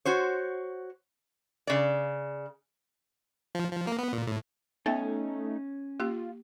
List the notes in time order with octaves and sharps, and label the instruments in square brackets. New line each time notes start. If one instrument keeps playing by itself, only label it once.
[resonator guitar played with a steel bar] F#4 C5 C#5
C#3 D5
[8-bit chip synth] F3
F3
A#3
B3
A#2
A2
[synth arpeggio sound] A3 D#4 [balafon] B3 E5 G5 [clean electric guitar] C#4
[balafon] A#3 G4 [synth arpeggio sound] F4